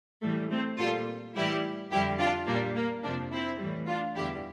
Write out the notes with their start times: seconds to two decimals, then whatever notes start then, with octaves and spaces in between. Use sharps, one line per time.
0.22 A2 E3 G3 A3
0.50 A3 C4
0.78 A#2 G3 F4 A4
1.35 A2 E3 G3 E4 G4
1.90 F2 D3 G3 E4 G4
2.18 D4 F4
2.47 A#2 G3 A#3 D4
2.75 A#3
3.03 F2 C3 F3 A#3 D4
3.32 C4 E4
3.59 A2 E3 G3
3.87 D4 F4
4.16 E2 D3 G3 E4 G4